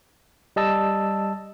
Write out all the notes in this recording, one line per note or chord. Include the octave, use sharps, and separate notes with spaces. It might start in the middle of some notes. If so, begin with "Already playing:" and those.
G3 D#5 A5 E6